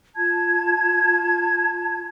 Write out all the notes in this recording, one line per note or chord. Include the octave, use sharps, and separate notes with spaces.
F4 A5 G#6